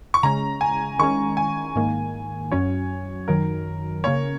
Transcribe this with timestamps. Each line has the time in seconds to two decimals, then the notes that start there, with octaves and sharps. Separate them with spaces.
0.14 C#6
0.23 C#3 G#3 C#4 A#5
0.61 G#5
0.99 D#3 G#3 C#4 C#6
1.37 G#5
1.76 G#2 D#3 A#3
2.51 F#2 F#3 C#4 C#5
3.28 F#2 D#3 F#3 A#4
4.04 C#3 A#3 C#4 C#5